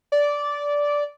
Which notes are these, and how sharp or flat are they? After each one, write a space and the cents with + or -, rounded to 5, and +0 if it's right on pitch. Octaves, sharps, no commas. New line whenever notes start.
D5 -10